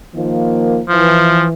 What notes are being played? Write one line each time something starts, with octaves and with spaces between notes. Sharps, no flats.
D#3 F3 A#3
E3 F3